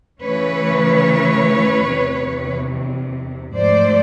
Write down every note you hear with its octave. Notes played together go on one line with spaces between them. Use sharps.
C#3 E3 A3 C#4 B4 C#5
E2 C3 D#3
G#2 F3 A3 C5 D5